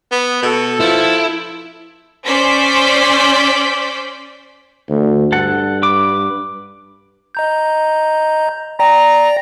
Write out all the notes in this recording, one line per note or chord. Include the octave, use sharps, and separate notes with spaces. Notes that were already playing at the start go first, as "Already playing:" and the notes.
B3
B2 A4
F3 E4
C#4 C5 D5 G6 B6
D2
G2 A4 F#5
B4 D6
D#5 A#5 G6
D5 G5 A#5 A#6